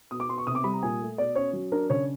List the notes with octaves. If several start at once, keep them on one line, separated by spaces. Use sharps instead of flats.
B2 D#6
D6
B3 C6
C#6
C3 D#6
D6
G3 B5
A#5
A#2 G#5
A3
B2 D5
C#4 C#5
F#3
D4 A#4
C#3 C#5